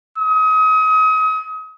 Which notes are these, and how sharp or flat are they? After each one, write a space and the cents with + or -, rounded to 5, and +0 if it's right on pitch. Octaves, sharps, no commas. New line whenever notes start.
D#6 +35